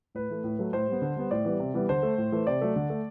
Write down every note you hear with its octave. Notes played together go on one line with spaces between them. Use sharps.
A2 B4
E3 A3
A2
F#3 A3
A2 C5
G3 B3
D3
G3 B3
A2 D5
E3 G3 B3
C3
E3 G3 B3
D3 C5
A3
A2
E3 A3
C3 D5
F#3 A3
D3
A3